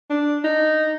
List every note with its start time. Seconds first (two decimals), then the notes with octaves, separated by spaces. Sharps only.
0.10 D4
0.45 D#4